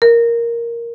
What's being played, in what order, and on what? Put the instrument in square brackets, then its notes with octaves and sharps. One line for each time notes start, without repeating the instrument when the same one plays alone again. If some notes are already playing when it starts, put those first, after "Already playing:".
[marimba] A#4